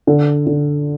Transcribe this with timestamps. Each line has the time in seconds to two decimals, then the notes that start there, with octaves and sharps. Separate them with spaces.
0.07 D3
0.47 D3